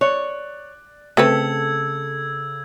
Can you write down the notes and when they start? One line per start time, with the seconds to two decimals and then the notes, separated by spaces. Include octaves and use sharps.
0.01 C#5 D5 F#6
1.17 C#3 A3 C4 A4 B4 E6 G#6